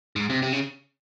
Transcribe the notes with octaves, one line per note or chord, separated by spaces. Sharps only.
G#2
C3
C3
C#3